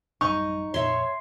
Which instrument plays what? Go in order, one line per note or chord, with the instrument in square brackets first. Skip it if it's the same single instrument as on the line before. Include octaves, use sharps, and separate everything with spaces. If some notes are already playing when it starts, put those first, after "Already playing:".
[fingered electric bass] A1 F#2 G3 [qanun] D#4 [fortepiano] C#6
[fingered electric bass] F2 A#2 [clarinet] C#5 [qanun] E5 C6